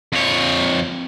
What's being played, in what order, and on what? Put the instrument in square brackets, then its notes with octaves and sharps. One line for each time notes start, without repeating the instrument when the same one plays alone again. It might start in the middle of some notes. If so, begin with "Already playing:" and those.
[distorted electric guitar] F2 C#5